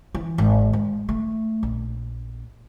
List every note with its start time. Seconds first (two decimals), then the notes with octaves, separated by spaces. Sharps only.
0.15 E3
0.38 G#1
0.73 G#3
1.09 A3
1.63 A#1